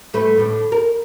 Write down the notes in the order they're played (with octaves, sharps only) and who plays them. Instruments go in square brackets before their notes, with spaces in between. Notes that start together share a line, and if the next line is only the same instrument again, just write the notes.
[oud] G#2 A3 B4
A2 D3
A#4